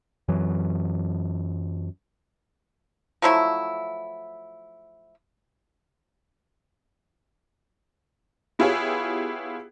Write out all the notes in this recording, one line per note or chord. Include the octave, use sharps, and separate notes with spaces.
F#2 E3 F#3
F3 F#3 A3 E4
B3 E4 F4 G4 G#4 C#5